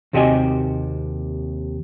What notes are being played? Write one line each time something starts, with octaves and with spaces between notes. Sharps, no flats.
D#2 C3 F#4 G4 D#5 G#5